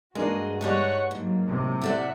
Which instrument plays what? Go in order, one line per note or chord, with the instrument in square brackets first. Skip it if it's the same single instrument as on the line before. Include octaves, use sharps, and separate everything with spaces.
[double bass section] G2 [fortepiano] G#3 A#3 D4 [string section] F#4 D#5 [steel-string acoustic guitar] G#4
[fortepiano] G3 G#3 [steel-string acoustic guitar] D#4 G4 C#5 [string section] F#5 C#6 F#6
[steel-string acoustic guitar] G#2 [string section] F#3 A#3
[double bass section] A2 C3
[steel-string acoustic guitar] G4 A4 D5 [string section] E5 F#5